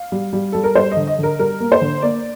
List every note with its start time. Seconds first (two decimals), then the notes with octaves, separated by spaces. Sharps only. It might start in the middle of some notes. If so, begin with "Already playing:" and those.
Already playing: F5
0.12 G3
0.33 G3
0.52 G3 A4
0.64 A#4
0.75 G3 C5
0.92 D#5
0.97 D3
1.07 D#5
1.18 D3 A#4
1.39 G3 A#4
1.60 A#3
1.72 C5
1.81 D3
2.02 A#3 D5